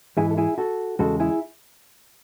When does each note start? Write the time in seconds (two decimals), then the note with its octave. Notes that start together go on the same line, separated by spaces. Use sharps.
0.17 G#2 E3 G#3 E4 G#4
0.31 A4
0.38 E4 G#4
0.58 F#4 A4
0.99 E2 C#3 G#3 F#4 A4
1.20 E4 G#4